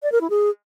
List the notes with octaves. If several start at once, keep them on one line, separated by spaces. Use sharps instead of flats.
D5
A#4
E4
G#4